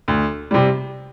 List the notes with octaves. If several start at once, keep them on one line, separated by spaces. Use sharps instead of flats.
D2
C3 G3